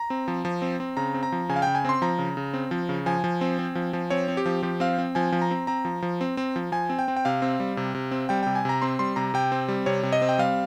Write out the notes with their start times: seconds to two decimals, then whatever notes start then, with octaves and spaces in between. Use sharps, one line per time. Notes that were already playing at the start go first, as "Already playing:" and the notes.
Already playing: A#5
0.10 C4
0.28 F3
0.45 F3
0.62 C4
0.80 C4
0.97 C#3 A#5
1.14 C4
1.23 A#5
1.32 F3
1.49 C#3 G#5
1.56 F5
1.62 C#3 G5
1.75 G#5
1.85 C4 C6
2.02 F3 A#5
2.19 C#3
2.37 C#3
2.54 C4
2.71 F3
2.89 C#3
3.06 F3 G#5
3.24 F3
3.41 C4
3.59 C4
3.75 F3
3.93 F3
4.10 C4 C#5
4.28 C4
4.37 G4
4.46 F3
4.63 F3 G4
4.80 C4 F5
4.98 C4
5.15 F3 G#5
5.32 F3
5.41 A#5
5.51 C4
5.67 C4 A#5
5.85 F3
6.02 F3
6.21 C4
6.37 C4
6.56 F3
6.72 F3 G#5
6.89 C4
6.99 G5
7.08 C4
7.17 G5
7.25 C3 F5
7.42 C4
7.60 G3
7.77 C3
7.95 C3
8.11 C4
8.29 G3 G5
8.43 C3 G5
8.55 G#5
8.65 C3 A#5
8.82 C4 C6
8.99 G3 C6
9.16 C3 A#5
9.34 C3 G5
9.52 C4
9.68 G3
9.86 C3 C#5
10.03 C3
10.13 D#5
10.22 C4
10.29 G5
10.38 G3 F5